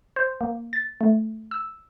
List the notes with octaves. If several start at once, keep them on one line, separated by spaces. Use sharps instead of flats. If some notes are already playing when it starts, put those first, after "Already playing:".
C5
A#3
A6
A3
E6